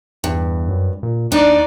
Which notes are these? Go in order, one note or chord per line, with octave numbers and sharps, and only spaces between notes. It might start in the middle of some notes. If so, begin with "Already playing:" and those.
E2 G2
F#2
A#2
D#2 D4 D#4 D5